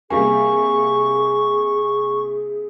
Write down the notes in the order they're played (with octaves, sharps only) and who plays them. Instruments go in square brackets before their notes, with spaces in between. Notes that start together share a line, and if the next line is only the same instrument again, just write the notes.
[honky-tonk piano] C3 G3 A#3 [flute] G#4 [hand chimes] G#5 [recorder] C#6